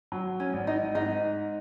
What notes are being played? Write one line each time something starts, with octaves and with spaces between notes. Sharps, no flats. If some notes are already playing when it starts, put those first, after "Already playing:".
F#3
C#4
G#1
D#4
G#2 D#4